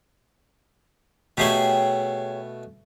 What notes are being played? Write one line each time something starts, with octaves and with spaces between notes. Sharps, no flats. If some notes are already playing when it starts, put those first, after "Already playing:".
B2 A3 E4 G4 G#4 C#5